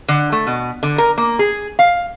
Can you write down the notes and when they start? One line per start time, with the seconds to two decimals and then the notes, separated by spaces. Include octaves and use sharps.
0.08 D3
0.32 A3
0.47 B2
0.83 D3
0.98 A#4
1.18 A#3
1.39 G#4
1.79 F5